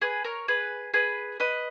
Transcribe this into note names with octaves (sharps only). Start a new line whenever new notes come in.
G#4 B4
A#4 C#5
G#4 B4
G#4 B4
B4 D#5